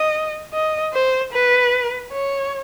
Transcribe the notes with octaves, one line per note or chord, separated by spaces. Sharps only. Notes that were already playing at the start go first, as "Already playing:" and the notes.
Already playing: D#5
D#5
C5
B4
C#5